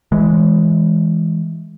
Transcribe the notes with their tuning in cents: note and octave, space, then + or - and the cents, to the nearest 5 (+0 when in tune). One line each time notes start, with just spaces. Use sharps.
E3 -10 G#3 +0